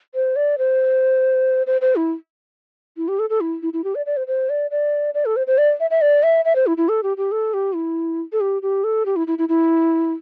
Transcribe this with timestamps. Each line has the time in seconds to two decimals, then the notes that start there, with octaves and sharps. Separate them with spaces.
0.15 C5
0.36 D5
0.58 C5
1.67 C5
1.81 C5
1.96 E4
2.97 E4
3.08 G4
3.19 A4
3.30 A4
3.41 E4
3.63 E4
3.73 E4
3.84 G4
3.95 D5
4.06 D5
4.17 C5
4.27 C5
4.50 D5
4.71 D5
5.14 D5
5.25 A4
5.36 C5
5.47 C5
5.58 D5
5.80 E5
5.91 E5
6.02 D5
6.23 E5
6.45 E5
6.56 C5
6.67 E4
6.77 E4
6.89 A4
7.03 G4
7.17 G4
7.32 A4
7.54 G4
7.75 E4
8.32 A4
8.41 G4
8.62 G4
8.84 A4
9.06 G4
9.16 E4
9.27 E4
9.38 E4
9.49 E4